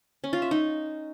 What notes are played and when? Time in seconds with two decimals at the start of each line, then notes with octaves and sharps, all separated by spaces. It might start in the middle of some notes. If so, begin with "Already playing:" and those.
0.24 C#4
0.33 F4
0.42 E5
0.51 D#4